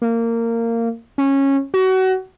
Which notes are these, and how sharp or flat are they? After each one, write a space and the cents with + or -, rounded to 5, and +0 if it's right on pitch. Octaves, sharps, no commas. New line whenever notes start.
A#3 -20
C#4 -15
F#4 +25